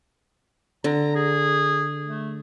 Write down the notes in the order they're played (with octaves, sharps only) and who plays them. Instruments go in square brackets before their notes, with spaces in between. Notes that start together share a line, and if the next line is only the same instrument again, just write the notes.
[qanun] D3 [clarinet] A#5
[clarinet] G#4
A3